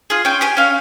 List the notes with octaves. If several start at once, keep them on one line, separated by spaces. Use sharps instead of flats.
F4 G#4
C#4 G5
G4 G#5
C#4 F5